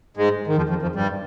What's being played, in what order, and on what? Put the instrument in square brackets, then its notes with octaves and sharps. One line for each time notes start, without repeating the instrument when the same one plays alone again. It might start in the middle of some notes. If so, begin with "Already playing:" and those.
[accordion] G#2 G#3
D#3
F2 F3
F2 F3
F2 F3
G2 G3